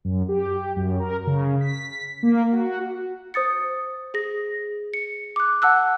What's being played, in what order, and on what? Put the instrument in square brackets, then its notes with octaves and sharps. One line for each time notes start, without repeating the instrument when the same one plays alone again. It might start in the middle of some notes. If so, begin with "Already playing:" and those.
[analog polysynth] F#2
G4
F#2
A#4
C#3
B6
A#3
F#4
[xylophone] C5 D#6 A6 C#7
G#4 A#6
C#7
D6 F#6
F#5 A5 E6 F#6